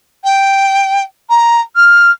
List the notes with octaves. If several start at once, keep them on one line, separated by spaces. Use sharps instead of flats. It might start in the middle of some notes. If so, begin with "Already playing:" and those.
G5
A#5
F6